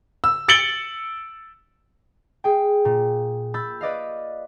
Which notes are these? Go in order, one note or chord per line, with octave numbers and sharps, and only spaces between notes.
E6
E6 A6 C#7 D7 F#7 G7
G#4 G5
A#2
B5 E6 G6 A6
B4 D5 D#5 F5